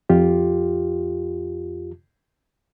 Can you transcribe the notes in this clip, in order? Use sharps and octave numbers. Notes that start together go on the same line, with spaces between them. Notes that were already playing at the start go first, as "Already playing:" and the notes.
F2 F4 G4